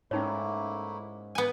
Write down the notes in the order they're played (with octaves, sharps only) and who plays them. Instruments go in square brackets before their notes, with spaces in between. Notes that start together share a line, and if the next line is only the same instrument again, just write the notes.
[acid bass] G#2 [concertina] A3 A#3 E4 [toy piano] C#4 D#4 C#5
[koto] B3 G#5